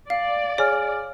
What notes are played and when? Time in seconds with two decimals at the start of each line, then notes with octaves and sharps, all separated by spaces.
0.10 D5 F5
0.58 G#4 C#5 G#5 F6